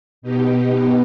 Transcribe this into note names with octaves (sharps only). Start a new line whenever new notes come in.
B2 B3 D#4 G4